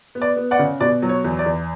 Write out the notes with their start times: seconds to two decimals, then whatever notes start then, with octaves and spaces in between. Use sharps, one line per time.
0.15 B3
0.22 D5
0.36 B3
0.51 D5 F#5
0.59 C#3
0.80 B2 D5
1.02 F#3
1.09 C#5
1.24 E2
1.39 D5
1.46 E2